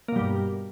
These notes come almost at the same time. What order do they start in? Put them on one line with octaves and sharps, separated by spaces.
A#3 B2 G3 G2